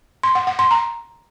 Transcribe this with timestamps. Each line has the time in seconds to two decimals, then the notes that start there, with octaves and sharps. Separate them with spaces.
0.23 C6
0.35 F#5
0.47 F#5
0.59 C6
0.71 A#5